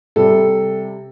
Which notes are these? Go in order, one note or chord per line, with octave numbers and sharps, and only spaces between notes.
C3 G3 A4